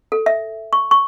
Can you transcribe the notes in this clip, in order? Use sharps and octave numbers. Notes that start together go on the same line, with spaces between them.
A4
E5
C#6
C#6